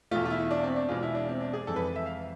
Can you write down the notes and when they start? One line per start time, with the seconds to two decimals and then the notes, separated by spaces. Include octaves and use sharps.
0.11 E2 B2 A3 F4
0.25 F4
0.30 E4
0.51 D4
0.63 C4
0.76 D4
0.89 E2 B2 G#3 F4
1.03 E4
1.15 D4
1.29 C4
1.41 D4
1.53 G#4
1.67 F1 F2 E3 G#3 A4
1.76 B4
1.96 E5
2.06 F5